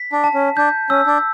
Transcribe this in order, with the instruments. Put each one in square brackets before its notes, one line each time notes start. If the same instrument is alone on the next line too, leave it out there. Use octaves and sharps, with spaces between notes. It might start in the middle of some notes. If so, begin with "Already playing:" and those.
Already playing: [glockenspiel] B6
[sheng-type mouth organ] D4
[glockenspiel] A5
[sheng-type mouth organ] C#4
[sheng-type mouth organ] D4 [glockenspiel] G6
[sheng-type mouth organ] C#4 [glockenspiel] E6
[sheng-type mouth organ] D4